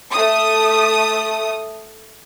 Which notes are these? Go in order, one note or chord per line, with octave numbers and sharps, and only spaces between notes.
A3 D#6